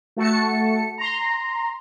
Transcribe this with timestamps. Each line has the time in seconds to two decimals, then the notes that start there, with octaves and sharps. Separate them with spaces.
0.17 A3 F#4 A5 C#7
0.98 A#5 C6